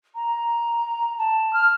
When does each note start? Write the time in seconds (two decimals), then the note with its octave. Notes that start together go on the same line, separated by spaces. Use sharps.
0.15 A#5
1.18 A5
1.53 F6